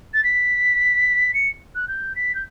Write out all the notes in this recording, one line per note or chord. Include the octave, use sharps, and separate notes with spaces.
A6
B6
C#7
F#6
G6
B6
G6